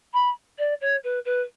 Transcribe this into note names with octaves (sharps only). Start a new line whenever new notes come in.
B5
D5
C#5
B4
B4